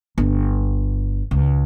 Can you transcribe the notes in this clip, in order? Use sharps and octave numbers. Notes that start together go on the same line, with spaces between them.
G1
C#2